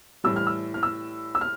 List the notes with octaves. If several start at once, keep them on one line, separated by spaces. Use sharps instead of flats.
A2 E3 G3 E6
F6
E6
F6
E6
E6
F6